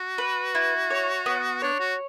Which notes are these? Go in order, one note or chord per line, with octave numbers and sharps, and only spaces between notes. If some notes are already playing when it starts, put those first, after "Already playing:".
Already playing: F#4
B4
E4
C#5
B3
D4 C#5
F#4